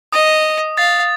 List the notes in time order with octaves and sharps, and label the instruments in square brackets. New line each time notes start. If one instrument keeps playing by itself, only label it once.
[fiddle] D#5 [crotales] D#6
[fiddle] F5 [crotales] A6